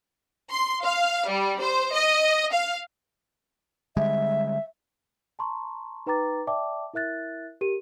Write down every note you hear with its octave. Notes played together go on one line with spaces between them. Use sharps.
C6
F5
G3
C5
D#5
F5
D3 G3 G#3 E5
A5 A#5 C6 C#6
D#4 B4 G5 A#5 D6 A6
D5 E5 G5 A5 D6
E4 A#4 E5 F#6 A6
G4 A#4 D#7